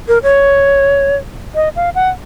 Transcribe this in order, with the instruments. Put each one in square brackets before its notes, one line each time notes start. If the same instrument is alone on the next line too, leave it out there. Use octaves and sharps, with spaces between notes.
[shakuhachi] A#4
C#5
D#5
F5
F#5